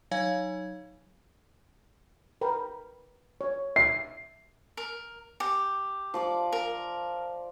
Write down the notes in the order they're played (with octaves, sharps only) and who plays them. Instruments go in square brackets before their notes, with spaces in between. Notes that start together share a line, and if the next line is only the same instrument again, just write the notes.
[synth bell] F#3 D#4 C#5 F5 G#5 G#6
[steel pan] A#4 B4 G5
C#5
[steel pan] E5 [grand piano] C7
[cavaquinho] A#4
G4
[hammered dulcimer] F3 D5 D6
[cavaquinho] A#4